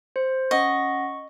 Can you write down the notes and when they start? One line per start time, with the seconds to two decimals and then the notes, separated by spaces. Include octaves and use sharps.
0.16 C5
0.51 C#4 D#5 F#5 C#6 A#6